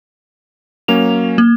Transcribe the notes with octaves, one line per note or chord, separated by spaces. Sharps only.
F#3 A#3 C#4 F7
A#3